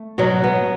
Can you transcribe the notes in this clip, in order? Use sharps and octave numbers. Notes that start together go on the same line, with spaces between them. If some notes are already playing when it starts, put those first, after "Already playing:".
Already playing: A3
B2 F#3 F#4
B2 B3